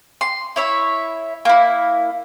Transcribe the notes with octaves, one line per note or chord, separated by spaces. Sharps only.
C6
E4 C#5 E5
A#3 E4